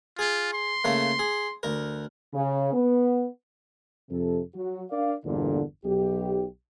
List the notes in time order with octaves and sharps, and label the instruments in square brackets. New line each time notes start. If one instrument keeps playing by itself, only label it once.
[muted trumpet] F4 [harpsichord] G#4
[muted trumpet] C6
[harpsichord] C#3 A3 A#3
G#4
D2 A#4
[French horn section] C#3
B3
[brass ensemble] F2 C3 A4
F#3 F#4
D4 A#4 D5 F5
G1 E2 A#2 D3
B1 G4